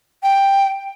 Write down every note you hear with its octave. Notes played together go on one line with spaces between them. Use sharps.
G5